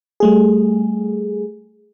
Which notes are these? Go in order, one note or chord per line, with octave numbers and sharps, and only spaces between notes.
G3 A3 G#4